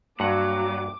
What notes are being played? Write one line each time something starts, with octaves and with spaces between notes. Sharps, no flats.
G2 F#3 A#3 F#5 D6